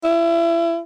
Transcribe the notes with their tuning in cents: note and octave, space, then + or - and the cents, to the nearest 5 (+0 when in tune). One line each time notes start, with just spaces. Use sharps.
E4 +30